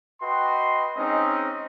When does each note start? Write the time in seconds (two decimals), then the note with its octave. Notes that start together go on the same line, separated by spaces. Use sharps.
0.22 F#4 B4 D#5 G5 C6
0.97 G#3 C4 C#4 D#4 D#5